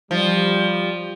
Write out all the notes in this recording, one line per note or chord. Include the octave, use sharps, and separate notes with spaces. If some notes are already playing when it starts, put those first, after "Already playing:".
F3 G3